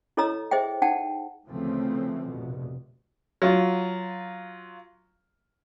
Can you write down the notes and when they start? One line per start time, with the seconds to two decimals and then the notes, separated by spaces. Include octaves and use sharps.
0.17 E4 A4 C#5 D#5 A#5 E6
0.51 G#4 C5 D#5 E5 G5
0.82 D#4 F#5 G5 A5
1.46 D2 C#3 E3 F3 A3 C4
2.29 F1 A#1 B2
3.42 F#3 F4